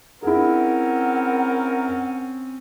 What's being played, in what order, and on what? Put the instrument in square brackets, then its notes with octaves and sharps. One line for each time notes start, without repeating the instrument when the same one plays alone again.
[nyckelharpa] C4 C#4 [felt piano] E4 G#4 [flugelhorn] A#4 [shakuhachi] F#5